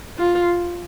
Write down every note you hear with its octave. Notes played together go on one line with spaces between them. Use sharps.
F4